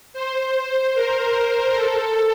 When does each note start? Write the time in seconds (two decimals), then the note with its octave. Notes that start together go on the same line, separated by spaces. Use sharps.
0.13 C5
0.94 A#4
1.74 A4